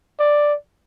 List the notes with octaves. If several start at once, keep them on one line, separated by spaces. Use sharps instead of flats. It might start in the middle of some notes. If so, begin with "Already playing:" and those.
D5